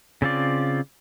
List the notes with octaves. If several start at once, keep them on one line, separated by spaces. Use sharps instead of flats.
C#3 C4 F4 D5